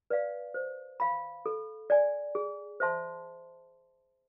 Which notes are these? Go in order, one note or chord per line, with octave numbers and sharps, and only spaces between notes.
B4 D5 F5
C5
F5 B5
A4
D5 G#5
G#4
C5 E5 A5 C6